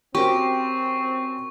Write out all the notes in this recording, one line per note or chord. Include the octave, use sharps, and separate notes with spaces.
C4 C#4 F#4 G4 A#4 C#6